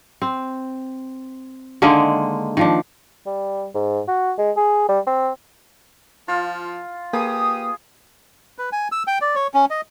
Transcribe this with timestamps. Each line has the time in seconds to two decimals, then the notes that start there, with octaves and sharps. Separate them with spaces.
0.22 C4
1.82 D3 D#3 G#3 A#3
2.57 D#3 F3 D4
3.26 G3
3.74 G#2
4.08 F#4
4.38 G#3
4.56 G#4
4.89 G3
5.07 C4
6.28 F3 F4
7.13 A#3 G4 G#4 B4 D#6
8.58 B4
8.72 G#5
8.92 E6
9.07 G5
9.21 D5
9.35 C#5
9.54 C#4
9.70 D#5